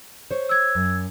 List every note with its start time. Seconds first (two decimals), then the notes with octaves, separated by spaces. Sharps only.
0.31 C5 C#5
0.49 E6 G#6
0.75 F#2